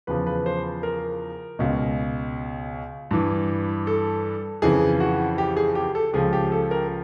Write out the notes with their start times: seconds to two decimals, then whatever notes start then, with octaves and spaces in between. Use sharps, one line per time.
0.07 E2 C#3 F3 B4
0.27 B4
0.46 C5
0.83 A#4
1.59 C#2 B2
3.11 G2 E3
3.87 A4
4.62 F2 C#3 E3 G#4
5.00 F#4
5.38 G4
5.57 G#4
5.75 G4
5.95 A4
6.13 C#2 C#3 F3 G#4
6.33 G4
6.52 A4
6.71 A#4